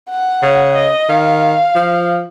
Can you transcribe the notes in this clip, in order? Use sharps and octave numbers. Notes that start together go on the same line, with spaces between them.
F#5
C#3
D#5
D#3 F5
F3